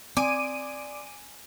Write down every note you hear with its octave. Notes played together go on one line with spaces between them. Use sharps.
C4 D5 G#5 C6 D6 D#6 D7 D#7